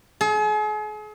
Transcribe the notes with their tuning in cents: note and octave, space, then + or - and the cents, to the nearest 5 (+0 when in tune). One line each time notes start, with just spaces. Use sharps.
G#4 +40